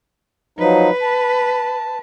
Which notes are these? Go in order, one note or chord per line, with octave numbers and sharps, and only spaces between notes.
F3 F#3 D#4 B4
A5